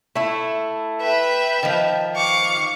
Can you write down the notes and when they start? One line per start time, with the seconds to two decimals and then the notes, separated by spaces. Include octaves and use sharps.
0.15 A3 E4
1.00 B4 E5 G5
1.63 D#3 F3
2.15 F5 C#6 D6